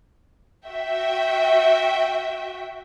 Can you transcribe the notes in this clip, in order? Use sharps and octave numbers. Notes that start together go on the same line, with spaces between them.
F#4 E5 G5